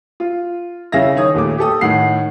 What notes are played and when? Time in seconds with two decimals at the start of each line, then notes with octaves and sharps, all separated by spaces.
0.20 F4
0.92 C#3 C#4 E4 E5 F5 A#6
1.16 D#3 C#5 D#6
1.34 D#2 A#2 A3 D6
1.58 G4 A4 D#6
1.81 A2 D#3 F#5 C7